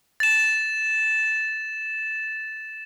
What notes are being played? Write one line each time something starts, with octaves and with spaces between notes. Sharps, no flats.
A6 E7